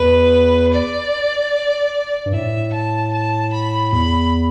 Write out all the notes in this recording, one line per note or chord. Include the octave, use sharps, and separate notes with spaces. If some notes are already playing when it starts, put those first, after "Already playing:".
Already playing: E2 B4
D5
G2
A2 E5
A5
A5
B5
E2 B5